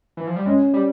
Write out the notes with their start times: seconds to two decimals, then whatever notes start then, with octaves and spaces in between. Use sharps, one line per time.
0.17 E3
0.27 F3
0.36 G3
0.45 G#3 C#4
0.74 G3